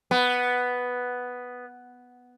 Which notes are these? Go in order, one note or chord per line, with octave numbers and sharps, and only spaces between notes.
B3